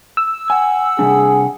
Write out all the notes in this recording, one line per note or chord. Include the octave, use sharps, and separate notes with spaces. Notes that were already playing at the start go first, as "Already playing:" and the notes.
E6
F#5 G#5
C3 G3 D4 G#4